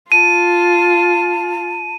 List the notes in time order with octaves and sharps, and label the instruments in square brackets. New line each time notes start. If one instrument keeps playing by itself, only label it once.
[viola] F4 [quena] A5 [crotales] D#7